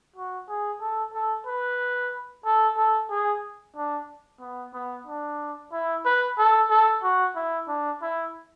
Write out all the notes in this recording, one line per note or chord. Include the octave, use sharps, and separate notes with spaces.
F#4
G#4
A4
A4
B4
A4
A4
G#4
D4
B3
B3
D4
E4
B4
A4
A4
F#4
E4
D4
E4